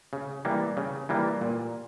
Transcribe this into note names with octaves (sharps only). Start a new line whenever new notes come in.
C#3
E3 G3 A#3
C#3
E3 G3 A#3
A#2